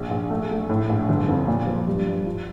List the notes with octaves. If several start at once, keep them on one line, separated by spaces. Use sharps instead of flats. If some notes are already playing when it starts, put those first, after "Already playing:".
Already playing: A#1
A#1
A3
A3
A2
A#1
G1
F2
A#2
F3
G2
G2
F4